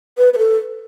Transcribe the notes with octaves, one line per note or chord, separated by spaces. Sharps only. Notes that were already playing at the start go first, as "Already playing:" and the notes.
B4
B4
A4